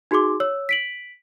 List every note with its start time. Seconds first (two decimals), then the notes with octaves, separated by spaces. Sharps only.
0.11 D#4 F#4 G#4 C6 D6
0.40 C#5 E6
0.69 B6 D7 F#7